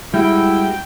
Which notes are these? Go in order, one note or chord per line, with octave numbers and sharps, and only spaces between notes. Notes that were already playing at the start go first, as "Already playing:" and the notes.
G3 G#3 E4 F#4 G5